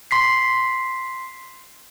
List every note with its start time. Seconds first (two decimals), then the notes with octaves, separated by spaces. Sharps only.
0.11 C6 B6 C7